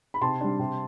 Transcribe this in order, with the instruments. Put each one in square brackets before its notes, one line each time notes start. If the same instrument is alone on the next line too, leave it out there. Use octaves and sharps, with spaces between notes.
[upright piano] B5
C3 A5 C6
G3 D4
C3